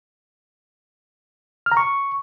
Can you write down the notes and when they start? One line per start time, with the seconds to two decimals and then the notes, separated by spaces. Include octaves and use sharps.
1.66 F6
1.72 A#5
1.77 C#6